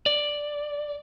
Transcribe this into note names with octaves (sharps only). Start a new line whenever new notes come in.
D5